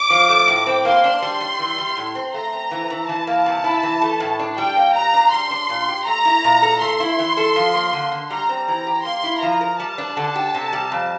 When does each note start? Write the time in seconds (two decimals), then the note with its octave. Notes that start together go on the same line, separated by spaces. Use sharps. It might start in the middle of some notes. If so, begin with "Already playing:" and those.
Already playing: D6
0.10 F3
0.29 A3
0.48 A2
0.66 C4
0.85 A#3 C6
1.04 D4
1.22 G3
1.41 G3
1.59 E3
1.78 G3
1.97 A2
2.15 C4
2.34 A3 A#5
2.53 C4
2.71 E3
2.90 E3
3.08 E3 A5
3.27 A#3
3.46 C3
3.64 E4
3.83 E3
4.02 A3
4.20 A2
4.39 D4
4.58 G3 G5
4.76 A#3
4.94 A#2 A#5
5.14 D4
5.32 G3 C6
5.51 D4
5.69 A#2
5.88 G4
6.07 A3 A#5
6.25 E4
6.44 A#2
6.62 A4
6.81 A3 C6
7.00 E4
7.19 E3
7.37 A4
7.56 F3
7.74 A#3
7.93 D3
8.12 D3
8.30 G3 A#5
8.49 C4
8.68 E3 A#5
8.87 G4
9.05 A#3 C6
9.24 E4
9.42 F3 A#5
9.61 A#4
9.80 G3 A5
9.98 D4
10.17 D3
10.35 G4
10.55 C3
10.73 G3
10.92 F2